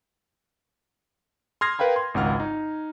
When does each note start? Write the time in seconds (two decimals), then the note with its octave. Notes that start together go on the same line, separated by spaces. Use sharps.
1.61 C6 D#6 F6 G#6 A#6 C7
1.79 A#4 B4 F5 G5 B5
1.96 C6
2.14 G#1 C#2 F#5 F6
2.40 D#4